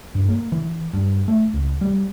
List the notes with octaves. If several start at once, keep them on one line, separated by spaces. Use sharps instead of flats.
G2
A#3
E3
G2
A3
C#2
G3